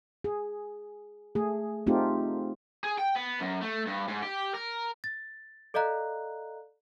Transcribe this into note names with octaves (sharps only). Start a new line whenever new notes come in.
G#4
A3 G#4
A3 C4 D#4 F4 G4
G#4
G5
B3
F#2
A3
G2
G#2
G4
A#4
A6
A4 D5 D#5 F5 A#5 F#6